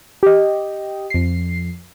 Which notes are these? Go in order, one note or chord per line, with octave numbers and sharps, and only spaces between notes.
G4 D#5
F2 C7